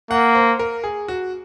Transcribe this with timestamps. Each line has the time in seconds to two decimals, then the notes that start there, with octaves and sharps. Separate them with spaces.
0.11 A#3 F#5
0.35 C5
0.59 A#4
0.84 G#4
1.08 F#4